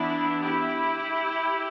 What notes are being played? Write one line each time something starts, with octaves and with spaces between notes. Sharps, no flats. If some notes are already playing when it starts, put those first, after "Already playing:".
Already playing: E3 B3 D4 E4
E4 G4